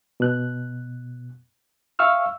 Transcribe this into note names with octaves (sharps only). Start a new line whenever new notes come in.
B2 F#6
E5 F5 C#6 E6 F6